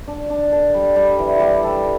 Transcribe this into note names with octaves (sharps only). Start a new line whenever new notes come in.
D4
D4
A4
G3
G3
E3
G3
A4